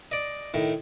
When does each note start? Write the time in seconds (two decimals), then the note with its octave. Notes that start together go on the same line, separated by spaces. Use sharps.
0.11 D5 D#5
0.54 A2 D#3